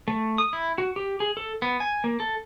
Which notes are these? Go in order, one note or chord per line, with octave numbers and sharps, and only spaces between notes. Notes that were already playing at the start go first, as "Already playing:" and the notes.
A3
D#6
E4
F#4
G4
G#4
A4
B3
G#5
A#3
A4